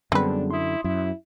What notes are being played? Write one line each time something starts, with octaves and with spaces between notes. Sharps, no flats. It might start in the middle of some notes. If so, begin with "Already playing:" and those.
F#2 D3 G3 B3 C4 D4 G#4 B4
E4 C6 D#6
F#2 E4